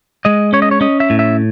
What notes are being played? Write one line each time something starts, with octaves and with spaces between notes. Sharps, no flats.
G#3 D#5
C#4 C#5
D#5
C#5
C#4 D#5
E5
A2
E5